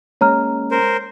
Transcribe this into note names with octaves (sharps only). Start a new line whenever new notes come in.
G#3 A#3 C#4 C#5 A#5 F6
A#4 C5